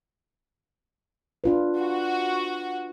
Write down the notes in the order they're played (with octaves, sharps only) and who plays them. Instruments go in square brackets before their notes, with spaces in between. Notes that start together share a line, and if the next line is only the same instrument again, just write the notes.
[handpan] D4 F4 B4
[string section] F#4